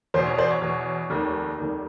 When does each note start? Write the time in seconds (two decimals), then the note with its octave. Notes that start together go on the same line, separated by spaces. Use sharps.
0.14 E2 C5
0.18 B2
0.26 C#5
0.38 C5 D5
0.50 C#5
0.62 E2 B2
1.10 F1 D#2 D#3
1.58 F1 D#2 D#3